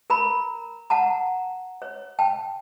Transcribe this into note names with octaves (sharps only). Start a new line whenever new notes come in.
A#4 A#5 B5
F#5 A5 A#5
C#5
G5 A5